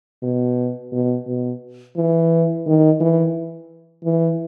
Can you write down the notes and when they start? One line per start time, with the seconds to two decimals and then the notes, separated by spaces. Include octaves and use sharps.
0.23 B2
0.92 B2
1.27 B2
1.97 E3
2.66 D#3
3.00 E3
4.04 E3